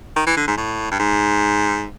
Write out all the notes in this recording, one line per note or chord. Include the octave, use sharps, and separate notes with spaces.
D#3
E3
D3
G#2
A2
G2
G#2